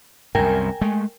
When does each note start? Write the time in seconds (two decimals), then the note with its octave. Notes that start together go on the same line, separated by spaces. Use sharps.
0.35 C2 F#2 A#4 G5 G#5
0.81 G#3 A3